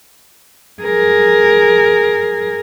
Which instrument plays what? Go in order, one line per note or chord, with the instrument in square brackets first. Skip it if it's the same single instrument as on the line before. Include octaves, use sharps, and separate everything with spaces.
[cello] G#4 A#4